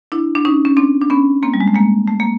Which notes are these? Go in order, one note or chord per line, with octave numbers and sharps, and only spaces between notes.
D4 E4
D4
C#4 D#4
C#4
C4 D4
D4
B3 C#4
A#3 C4
G3
G#3
A3
G#3 A#3
A3
A#3